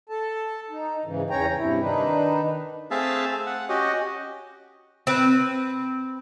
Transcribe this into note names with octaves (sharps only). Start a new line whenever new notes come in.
A4 A5
D#4
G#2 C#3 E3
E2 C#4 C#5 G5 A#5
G2 C3 E4
D#3 D4 D#4 B4
A3 C4 G#4 E5 F5 A5
F#5
C#4 F#4 G4 D#5
C4 B4